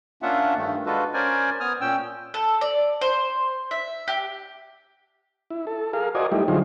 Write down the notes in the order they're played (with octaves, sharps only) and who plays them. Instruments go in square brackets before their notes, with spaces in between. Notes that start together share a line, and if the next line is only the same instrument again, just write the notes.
[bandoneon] A#3 C#4 D4 F4 E5 F#5
G2 D#3 A3
G#3 D4 F4 F#4 A4 B4
C#4 A#4 C5 D5 G#5
B3 G#5 D#6 F6
A#2 C#4 G5 E6
[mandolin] A4
D5
C5
E5
G4
[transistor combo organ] E4
A4
G#4 A#4 F5
F#4 A#4 C5 D5 D#5 G#5
G3 A3 D#4 E4 G4
D3 F#3 D#4 F4 G#4 C5